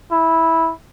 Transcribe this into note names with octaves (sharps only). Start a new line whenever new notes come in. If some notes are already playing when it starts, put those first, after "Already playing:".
E4